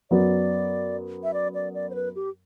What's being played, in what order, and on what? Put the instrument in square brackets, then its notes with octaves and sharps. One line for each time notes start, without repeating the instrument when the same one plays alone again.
[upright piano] F#2 F#3 B3 F#4 [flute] D5
[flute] E5
D5
D5
D5
C5
B4
G4